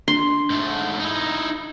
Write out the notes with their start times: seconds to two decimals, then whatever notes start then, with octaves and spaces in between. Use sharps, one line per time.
0.08 D4 C6
0.50 G#2 A3
1.00 D#4 E4